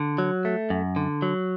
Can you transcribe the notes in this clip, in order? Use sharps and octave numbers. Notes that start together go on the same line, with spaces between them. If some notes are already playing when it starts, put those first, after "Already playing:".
Already playing: D3
F#3
A3
F#2
D3
F#3